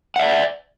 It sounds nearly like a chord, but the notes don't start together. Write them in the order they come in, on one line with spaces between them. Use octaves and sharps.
F#5 E5 D5